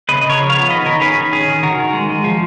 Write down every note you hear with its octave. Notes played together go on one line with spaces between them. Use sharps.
C#3 B4 D#5
C#3
A#4 C#5
F3
C#5 F5
B3
D#3 B4 D#5
D#3 A#4 C#5
C#4 G#4 B4
D#3
C#4 G#4
D#3
D#3 F#4 A#4
D#3
G#3
G#3
F3